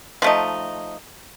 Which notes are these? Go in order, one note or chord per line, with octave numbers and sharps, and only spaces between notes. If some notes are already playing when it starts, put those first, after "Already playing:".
F3 A3 D#4